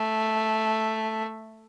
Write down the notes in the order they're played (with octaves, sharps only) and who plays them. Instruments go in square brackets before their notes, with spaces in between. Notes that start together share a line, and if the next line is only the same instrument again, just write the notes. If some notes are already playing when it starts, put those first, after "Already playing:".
Already playing: [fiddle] A3